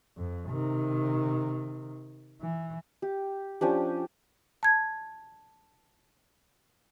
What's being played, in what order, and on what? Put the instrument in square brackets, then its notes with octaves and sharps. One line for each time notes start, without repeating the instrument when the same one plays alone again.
[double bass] F2
C3 D#3
E3
[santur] G4
F3 C#4 D4 G4
[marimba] A5 G#6